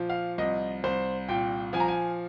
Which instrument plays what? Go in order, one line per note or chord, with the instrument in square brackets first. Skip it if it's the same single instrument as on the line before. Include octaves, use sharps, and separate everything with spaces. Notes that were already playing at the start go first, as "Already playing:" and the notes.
Already playing: [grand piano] A#2 F3
F5
C2 D#5
C2 C5
A#2 G5
F3 G#5
A#5
G#5